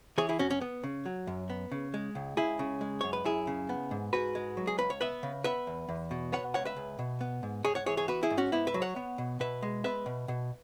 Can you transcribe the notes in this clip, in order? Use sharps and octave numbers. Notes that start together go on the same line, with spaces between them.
E3 G#4 C#5
E4 G#4
F#2 C#4 F#4
C#4
B3
C#3
F#3
F#2
B3
C#3
G#3
C#2
C#2 E4 G#4
C#3
G#3
F#2 C#5
B4
F#2 E4 G#4
C#3
B3
G#2
G#2 F#4 B4
G#3
F#3
G#4
C#2 B4
C#5
B3 B4 E5
C#3
B3 B4 E5
E2
E2
B2
B3 C#5 F#5
C#2 C#5 F#5
B4 E5
C#2
B2
B3
G#2
G#2 G#4 C#5
C#5 F#5
E3 G#4 C#5
G#4 C#5
B3 F#4 B4
E4 G#4
G#2
C#4 F#4
G#2 B3 E4
B4 E5
F#3
C#5 F#5
B3
B2
B2 B4 E5
G#3
B3 B4 E5
B2
B2